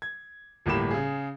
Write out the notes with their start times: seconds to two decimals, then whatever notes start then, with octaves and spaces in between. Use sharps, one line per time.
0.02 G#6
0.66 G1 A2 A#3 G4 B5 E7
0.91 C#3 G#4